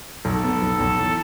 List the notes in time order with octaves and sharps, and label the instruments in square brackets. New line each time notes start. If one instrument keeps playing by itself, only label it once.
[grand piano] B1 [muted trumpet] A4
[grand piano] B3
B1
B1
E3